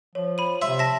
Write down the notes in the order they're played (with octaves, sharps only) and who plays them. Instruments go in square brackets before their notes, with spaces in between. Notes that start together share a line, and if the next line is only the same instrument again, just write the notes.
[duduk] F3 [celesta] C#5
[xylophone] B5 D#7
[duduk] C3 [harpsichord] E5 [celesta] C6
[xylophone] A5 B6 [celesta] A#6